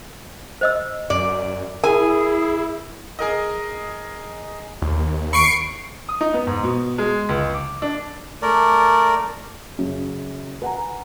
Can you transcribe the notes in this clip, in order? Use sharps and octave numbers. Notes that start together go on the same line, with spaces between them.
C5 D#5 E6
F#2 D5
E4 G#4 A#4 G#5
G#4 A#4 D#5
D#2
B5 C#6 C7 D7
D#6
D#4
B3
G#2
B2
G#3
C#2
D6
D4
A3 A#4 D5
F#2 C#3
B4 F#5 G#5 A#5